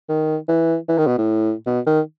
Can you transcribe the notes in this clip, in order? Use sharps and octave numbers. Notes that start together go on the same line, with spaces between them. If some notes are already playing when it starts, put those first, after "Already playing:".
D#3
E3
E3
D#3
B2
A2
B2
D#3